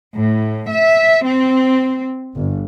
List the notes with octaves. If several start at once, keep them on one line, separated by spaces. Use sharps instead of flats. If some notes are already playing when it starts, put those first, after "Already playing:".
A2
E5
C4
G1